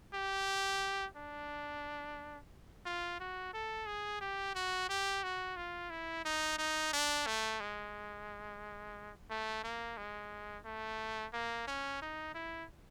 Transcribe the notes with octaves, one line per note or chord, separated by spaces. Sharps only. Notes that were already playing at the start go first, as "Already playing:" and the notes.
G4
D4
F4
F#4
A4
G#4
G4
F#4
G4
F#4
F4
E4
D#4
D#4
D4
A3
G#3
A3
A#3
G#3
A3
A#3
C#4
D#4
E4